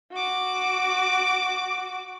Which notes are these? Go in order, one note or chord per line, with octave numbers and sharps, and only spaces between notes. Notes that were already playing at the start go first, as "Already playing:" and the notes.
F#4 D6